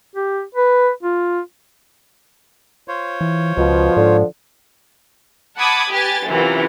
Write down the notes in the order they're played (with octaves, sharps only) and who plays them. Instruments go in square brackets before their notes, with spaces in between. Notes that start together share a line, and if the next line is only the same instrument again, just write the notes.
[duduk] G4
B4
F4
[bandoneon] F4 C5 C#5
[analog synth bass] E3
[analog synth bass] C#2 [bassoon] B2 [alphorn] F3
[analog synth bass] G#2 [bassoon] D3
[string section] F#5 A5 B5 D6 D#6 G#6
G4 B4 G#5 A6
F#2 C3 E3 F4